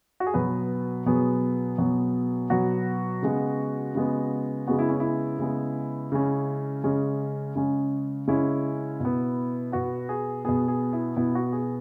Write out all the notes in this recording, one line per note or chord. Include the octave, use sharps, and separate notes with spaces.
F#4
G#4
B2 F#3 B3 B4
B2 F#3 B3 G#4
B2 F#3 B3
B2 F#3 B3 F#4
C#3 G#3 B3
C#3 G#3 B3
C#3 G#3 B3 F#4
E4
C#4
E4
C#3 G#3 B3
C#3 G#3 C#4
C#3 G#3 C#4
C#3 G#3 C#4
C#3 G#3 C#4 E4
B2 B3
B2 B3 F#4
G#4
B2 B3 G#4
G#4
E4
B2 B3 E4
F#4
G#4